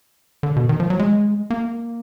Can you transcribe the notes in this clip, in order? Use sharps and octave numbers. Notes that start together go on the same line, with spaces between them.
D3
B2
D#3
F3
F#3
G#3
A#3